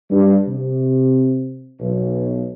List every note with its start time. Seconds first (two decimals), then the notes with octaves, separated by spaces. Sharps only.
0.11 G2
0.48 C3
1.80 B1